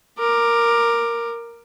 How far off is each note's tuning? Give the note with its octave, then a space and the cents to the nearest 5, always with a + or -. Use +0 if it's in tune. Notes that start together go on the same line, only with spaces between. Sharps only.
A#4 +0 D6 +15